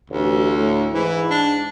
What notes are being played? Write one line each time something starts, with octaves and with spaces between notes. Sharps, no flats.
A1 D2
A2
G#2 E3
D4